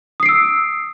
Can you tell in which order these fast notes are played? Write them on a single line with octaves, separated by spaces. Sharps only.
D#6 C7 D7 E6